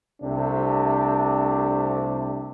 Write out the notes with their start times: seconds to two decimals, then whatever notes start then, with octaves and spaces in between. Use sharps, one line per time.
0.21 C2 C3 A3 D4